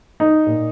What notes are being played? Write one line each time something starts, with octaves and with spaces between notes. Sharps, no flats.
D#4
A#2